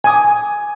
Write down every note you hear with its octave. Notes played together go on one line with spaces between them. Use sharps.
G#5 D6 D#6